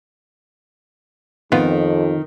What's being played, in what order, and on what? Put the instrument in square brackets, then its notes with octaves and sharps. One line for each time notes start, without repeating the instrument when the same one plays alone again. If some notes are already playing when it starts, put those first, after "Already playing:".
[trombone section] F2 [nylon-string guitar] D#3 [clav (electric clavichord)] B3 F4